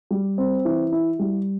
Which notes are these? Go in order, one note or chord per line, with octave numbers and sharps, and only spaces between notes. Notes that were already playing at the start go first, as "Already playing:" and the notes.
G3
C4
E3
E4
G3